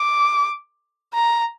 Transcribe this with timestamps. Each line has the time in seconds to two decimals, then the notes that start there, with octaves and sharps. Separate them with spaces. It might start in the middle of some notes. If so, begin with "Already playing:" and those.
Already playing: D6
1.14 A#5